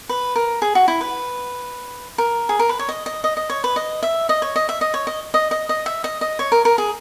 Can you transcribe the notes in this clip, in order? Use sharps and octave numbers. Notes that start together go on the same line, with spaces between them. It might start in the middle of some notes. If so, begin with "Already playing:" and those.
B4
A#4
G#4
F#4
E4
B4
A#4
G#4
A#4
B4
C#5
D#5
D#5
D#5
D#5
C#5
B4
D#5
E5
D#5
C#5
D#5
E5
D#5
C#5
D#5
D#5
D#5
D#5
E5
D#5
D#5
C#5
A#4
A#4
G#4